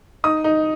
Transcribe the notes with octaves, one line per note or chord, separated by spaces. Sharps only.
D#4 D#6
D#4